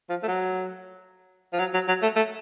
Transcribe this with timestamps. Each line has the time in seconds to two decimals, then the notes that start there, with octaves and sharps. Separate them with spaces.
0.09 F3
0.23 A3
0.28 F#3
1.53 F3
1.59 F#3
1.74 F#3
1.88 F#3
2.02 A3
2.16 A3